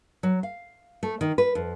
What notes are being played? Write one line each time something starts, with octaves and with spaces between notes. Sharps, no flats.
F#3
F5
A3
D#3
B4
F2